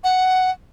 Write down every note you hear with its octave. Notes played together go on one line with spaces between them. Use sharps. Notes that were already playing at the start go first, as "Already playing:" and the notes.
F#5